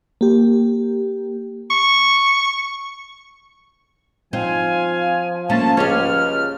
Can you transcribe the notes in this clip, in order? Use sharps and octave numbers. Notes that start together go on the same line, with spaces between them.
A#3 G4
C#6
F3 C4 D#4 F5 G#5
A3 A#3 C#4 A5
C#2 C#4 G4 G#4 F6